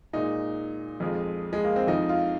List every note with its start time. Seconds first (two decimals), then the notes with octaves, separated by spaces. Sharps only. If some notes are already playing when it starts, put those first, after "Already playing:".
0.13 A#2 G#3 D#4
1.00 F2 F3 G#3
1.53 G#3
1.64 A#3
1.76 C4
1.87 F2 F3 G#3 D#4
2.09 F4